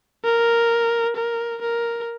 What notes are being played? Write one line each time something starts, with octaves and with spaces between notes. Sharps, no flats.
A#4
A#4
A#4